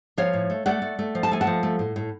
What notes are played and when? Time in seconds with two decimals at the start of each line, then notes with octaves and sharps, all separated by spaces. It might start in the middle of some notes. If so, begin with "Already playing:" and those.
0.18 F3 C#5 F5
0.34 A2
0.50 A3
0.66 A3 D5 F#5
0.82 A3
0.99 A3
1.15 F3
1.23 A5
1.32 A3 G#5
1.41 F#5 A5
1.47 F3
1.63 A3
1.79 A2
1.96 A2